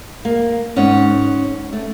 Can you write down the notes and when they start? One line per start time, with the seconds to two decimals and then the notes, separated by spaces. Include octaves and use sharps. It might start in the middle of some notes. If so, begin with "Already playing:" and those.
0.25 A#3
0.76 G#2 C#4 D#5 F#5
1.73 A3